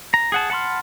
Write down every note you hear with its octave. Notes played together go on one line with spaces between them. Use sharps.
A#5
G#4 F#5 A5
F#5 A5 B5 C6 F6